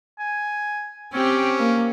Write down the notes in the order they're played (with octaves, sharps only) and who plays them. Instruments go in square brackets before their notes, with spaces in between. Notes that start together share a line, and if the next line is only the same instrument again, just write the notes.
[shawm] G#5
[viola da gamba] C4 G4 [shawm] C#4
[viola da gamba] A#3